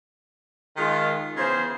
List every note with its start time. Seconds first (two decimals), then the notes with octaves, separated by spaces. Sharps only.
0.77 D#3 G#3 F4
1.36 C#3 E3 B3 F4 C5